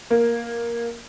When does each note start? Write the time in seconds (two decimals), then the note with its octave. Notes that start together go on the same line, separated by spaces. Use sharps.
0.10 A#3